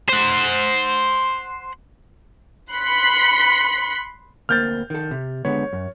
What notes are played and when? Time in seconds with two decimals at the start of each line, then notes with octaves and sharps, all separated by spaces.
0.09 C5 F#5
2.70 B5 C6 F#6 B6 C#7
4.49 D2 A#3 C4 F6 G6 A6
4.90 D#3 A4
5.11 C3
5.45 D3 G#3 B3 C#5
5.73 F#2